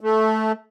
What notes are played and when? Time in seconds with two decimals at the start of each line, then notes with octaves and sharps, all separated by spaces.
0.01 A3